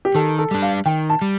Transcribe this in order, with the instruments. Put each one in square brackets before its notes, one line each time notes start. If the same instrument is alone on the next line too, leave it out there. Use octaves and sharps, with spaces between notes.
[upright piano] G4
[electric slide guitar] D#3 [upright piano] A4
[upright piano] A4
[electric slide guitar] G3 D4
[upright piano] F5
[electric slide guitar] D#3 [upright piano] G5
[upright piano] A5
[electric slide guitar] G3